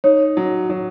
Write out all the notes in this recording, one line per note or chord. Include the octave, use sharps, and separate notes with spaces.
D#4 C#5
F#3
F#3